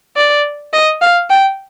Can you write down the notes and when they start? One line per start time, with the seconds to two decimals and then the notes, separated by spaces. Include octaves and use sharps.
0.16 D5
0.73 D#5
1.01 F5
1.30 G5